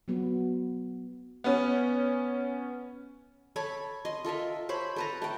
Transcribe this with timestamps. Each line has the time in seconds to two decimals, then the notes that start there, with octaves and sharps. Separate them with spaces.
0.08 F#3 B3 F#4
1.44 B3 C#4
3.56 A4 C#5 B5
4.05 D#5 C6
4.25 F4 A4 A#4 E5
4.69 C5 C#5 B5
4.96 A4 B4 A#5
5.22 A3 G5